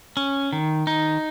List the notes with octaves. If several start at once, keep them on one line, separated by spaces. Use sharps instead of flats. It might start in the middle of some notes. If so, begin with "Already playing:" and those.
C#4
D#3
D#4